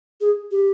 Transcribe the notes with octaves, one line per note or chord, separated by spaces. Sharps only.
G#4
G4